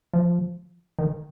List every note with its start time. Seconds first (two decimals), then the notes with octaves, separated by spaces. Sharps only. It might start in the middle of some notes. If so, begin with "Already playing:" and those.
0.13 F3
0.99 D#3